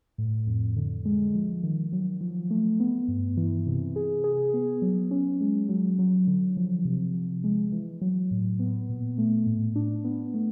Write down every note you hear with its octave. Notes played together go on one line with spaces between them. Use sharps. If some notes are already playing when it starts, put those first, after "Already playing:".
A2
F2
D3
G#3
F3
D#3
F#3
F3
A3
B3
G2
E3
C3
G#4
G#4
B3
F#3
C#4
G#3
F#3
F#3
D3
F3
C3
F3
G#3
E3
F#3
A2
B3
A#2
A3
A2
D4
B3
A3